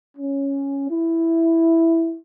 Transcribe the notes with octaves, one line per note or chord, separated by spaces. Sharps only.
C#4
E4